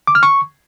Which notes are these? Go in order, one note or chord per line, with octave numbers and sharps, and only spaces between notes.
D6
F6
C#6